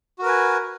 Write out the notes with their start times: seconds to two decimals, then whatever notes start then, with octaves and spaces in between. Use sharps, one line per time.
0.19 F#4
0.22 A#4
0.25 B4
0.29 G#5